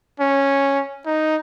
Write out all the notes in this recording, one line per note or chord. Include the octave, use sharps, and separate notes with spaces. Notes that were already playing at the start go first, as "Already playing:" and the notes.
C#4
D#4